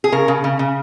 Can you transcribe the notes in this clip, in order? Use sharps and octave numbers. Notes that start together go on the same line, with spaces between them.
G#4
C#3 A#4
C#3
C#3
C#3